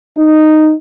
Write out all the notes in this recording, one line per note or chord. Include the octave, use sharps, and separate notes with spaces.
D#4